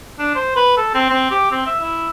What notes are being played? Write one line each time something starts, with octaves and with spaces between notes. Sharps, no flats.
D4
C5
B4
A4
C4
C4
G4
C4
E5
E4